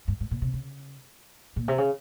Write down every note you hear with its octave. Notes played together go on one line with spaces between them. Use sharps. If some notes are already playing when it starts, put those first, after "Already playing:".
G2
G#2
A#2
C3
C#3
A#2
C3
C#3